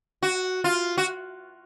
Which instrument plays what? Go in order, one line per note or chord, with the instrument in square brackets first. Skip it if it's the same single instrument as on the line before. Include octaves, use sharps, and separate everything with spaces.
[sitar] F#4
F4
F#4